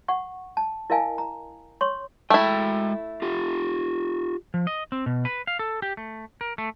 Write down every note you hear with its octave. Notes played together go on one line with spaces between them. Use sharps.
F#5 C#6
A5
E4 A#4 D#5 F5 G#5 A5
A#5
C#5 C6 C#6
G#3 A3 E4 G5
F4 G4
F3
D#5
C4
B2
B4
F5
A4
G4
A3
A#4
A3